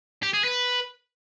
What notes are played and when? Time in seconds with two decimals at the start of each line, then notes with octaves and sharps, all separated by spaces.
0.23 G4
0.33 G#4
0.44 B4